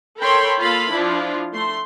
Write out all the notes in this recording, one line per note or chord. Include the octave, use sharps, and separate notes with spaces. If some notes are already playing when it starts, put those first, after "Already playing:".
A4 A#4 C#5 G5 B5 C6
A#3 F4 A4 F5 B5
F3 D4 E4 F4
A3 C6